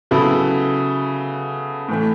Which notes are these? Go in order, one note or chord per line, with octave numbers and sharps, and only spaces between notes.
C#3 F#3 B3 E4 A4
A2 E3 A3